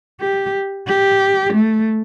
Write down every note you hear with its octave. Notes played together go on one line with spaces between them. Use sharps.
G4
G4
A3